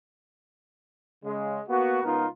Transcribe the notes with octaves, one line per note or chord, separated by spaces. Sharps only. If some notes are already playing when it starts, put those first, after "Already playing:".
C#3 G#3
A#3 B3 F#4
C#2 B3 D#4 F4 A#4